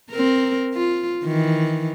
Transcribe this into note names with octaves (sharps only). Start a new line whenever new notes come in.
C4 A#4
F4
D#3 E3